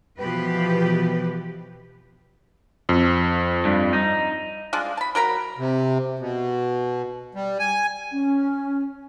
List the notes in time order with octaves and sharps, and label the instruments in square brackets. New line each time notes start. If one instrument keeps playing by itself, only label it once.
[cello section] B2 E3 F3 G4 B4
[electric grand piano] F2
[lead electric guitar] G2
D#4
[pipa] G#3 D4 F4
A5 B5
F#3 A#4 A#5 B5
[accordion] C3
B2
G3
G#5
[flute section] C#4